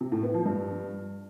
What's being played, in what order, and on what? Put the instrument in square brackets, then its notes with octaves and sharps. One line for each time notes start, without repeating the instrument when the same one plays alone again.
[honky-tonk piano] C3
A2
B3
F3
G2